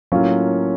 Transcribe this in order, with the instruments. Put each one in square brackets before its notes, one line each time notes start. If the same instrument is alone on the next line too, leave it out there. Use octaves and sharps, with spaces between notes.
[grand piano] A2 F#3 A#3 C#4 F4